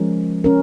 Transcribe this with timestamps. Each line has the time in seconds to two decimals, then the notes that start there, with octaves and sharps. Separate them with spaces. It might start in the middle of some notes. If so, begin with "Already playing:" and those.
Already playing: F3 G#3 C#4 A#4
0.44 C#4 A#4